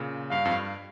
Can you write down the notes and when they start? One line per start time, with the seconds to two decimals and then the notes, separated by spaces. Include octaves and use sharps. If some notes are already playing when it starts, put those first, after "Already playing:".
Already playing: A#2 C#3
0.31 G2 F5
0.45 F2
0.51 G2